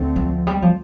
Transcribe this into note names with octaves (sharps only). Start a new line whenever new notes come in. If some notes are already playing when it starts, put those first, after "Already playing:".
Already playing: D2 D3 A3 C4
F3
G3
F3